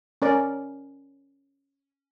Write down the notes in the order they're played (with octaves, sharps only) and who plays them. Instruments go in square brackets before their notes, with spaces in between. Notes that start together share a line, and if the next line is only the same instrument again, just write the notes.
[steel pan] C#4 A#4 D5